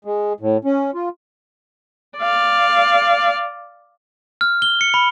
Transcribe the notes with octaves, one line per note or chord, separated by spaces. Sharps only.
G#3
A2
C#4
F4
D5 F5
F6
G7
C#7
B5